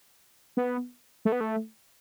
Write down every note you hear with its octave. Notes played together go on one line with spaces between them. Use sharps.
B3
A3
B3
A3